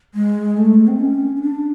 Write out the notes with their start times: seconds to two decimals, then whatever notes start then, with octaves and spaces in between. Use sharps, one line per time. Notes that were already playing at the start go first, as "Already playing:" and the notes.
0.14 G#3
0.57 A3
0.88 C4
1.00 C#4
1.36 C#4
1.42 D4